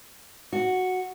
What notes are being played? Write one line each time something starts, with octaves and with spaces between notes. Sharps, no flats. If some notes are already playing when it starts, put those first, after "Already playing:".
F#4